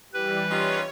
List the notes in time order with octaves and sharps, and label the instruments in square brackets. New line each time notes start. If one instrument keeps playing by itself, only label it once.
[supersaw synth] E3 G3 [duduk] G4 [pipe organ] B4
[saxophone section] C#4 D#4 F4 [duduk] G4 [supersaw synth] C#5